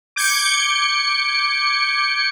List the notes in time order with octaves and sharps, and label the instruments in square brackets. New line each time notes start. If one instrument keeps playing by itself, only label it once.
[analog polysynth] D6 G6 G#6 C#7